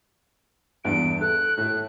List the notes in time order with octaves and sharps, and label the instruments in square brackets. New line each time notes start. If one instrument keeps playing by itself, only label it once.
[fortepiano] E2 G2 B3 [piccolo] D7
[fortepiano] A4 [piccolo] F#6
[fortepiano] A2 A3 [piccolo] F#6